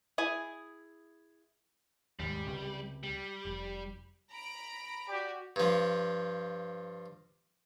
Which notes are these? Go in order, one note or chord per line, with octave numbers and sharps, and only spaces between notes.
E4 G#4 G#5
D#2 G#2 G3
C#2 C3
G3
F1
A#5 B5 D7
F#4 G4 D5
G2 F3